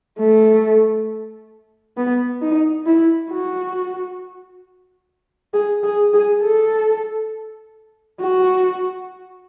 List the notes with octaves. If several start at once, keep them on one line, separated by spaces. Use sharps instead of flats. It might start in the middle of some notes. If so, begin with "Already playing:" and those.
A3
B3
D#4
E4
F#4
G#4
G#4
G#4
A4
F#4